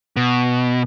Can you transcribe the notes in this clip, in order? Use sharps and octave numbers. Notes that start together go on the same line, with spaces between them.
B2